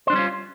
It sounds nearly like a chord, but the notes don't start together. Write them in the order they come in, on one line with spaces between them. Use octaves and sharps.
C5 D4 G3 C#4 F4